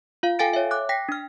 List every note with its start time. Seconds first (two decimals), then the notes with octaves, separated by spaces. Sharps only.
0.23 F4 F5
0.39 A4 F5 G5 G#5 A6 D7
0.53 C#5 E5
0.71 D6 F#6
0.89 G5 A#6 B6
1.09 D4 F6